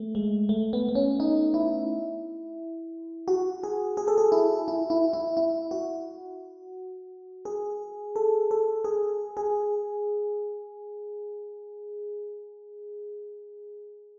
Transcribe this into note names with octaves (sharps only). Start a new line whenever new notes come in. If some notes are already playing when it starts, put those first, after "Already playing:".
Already playing: A3
G#3
A3
B3
B3
C#4
D#4
E4
F#4
G#4
G#4
A4
G#4
E4
E4
E4
E4
E4
F#4
G#4
A4
A4
G#4
G#4